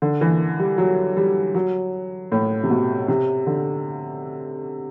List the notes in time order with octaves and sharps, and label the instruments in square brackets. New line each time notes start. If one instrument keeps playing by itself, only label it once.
[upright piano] D3
E3
G3
F#3
G3
F#3
A2
C3
B2
C3
D3